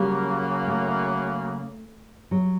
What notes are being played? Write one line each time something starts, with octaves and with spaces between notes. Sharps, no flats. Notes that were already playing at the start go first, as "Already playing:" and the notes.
Already playing: C#3 F#3 G3 A#3
A3
F#3